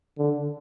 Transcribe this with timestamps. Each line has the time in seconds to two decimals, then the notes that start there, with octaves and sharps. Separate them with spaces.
0.18 D3